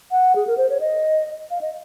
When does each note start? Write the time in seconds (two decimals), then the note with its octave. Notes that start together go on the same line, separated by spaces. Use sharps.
0.11 F#5
0.36 G#4
0.47 A#4
0.57 C5
0.70 C#5
0.80 D#5
1.51 F5
1.61 D#5